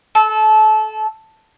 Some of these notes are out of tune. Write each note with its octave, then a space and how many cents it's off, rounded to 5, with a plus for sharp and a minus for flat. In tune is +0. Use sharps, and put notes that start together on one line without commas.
A4 -25